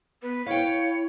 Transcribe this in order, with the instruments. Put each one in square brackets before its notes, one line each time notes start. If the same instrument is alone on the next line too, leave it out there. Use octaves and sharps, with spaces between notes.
[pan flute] B3 [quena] B4
[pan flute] E4 [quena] C#5 [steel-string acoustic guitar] F5 G5